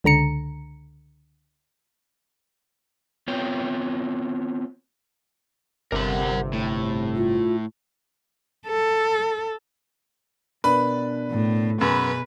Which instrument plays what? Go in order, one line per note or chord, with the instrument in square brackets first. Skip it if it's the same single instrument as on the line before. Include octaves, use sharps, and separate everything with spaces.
[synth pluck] C#2 D3 A#5 C#7
[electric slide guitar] B3 C4 F4 C#5 G5
[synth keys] G1 C3 [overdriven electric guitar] A#4 F#5
[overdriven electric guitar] A2
[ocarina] F4
[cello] A4
[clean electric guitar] B2 D4 A#4 [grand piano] B4 B5
[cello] A2
[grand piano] F#2 [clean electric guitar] B2 G#4 B5 [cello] B4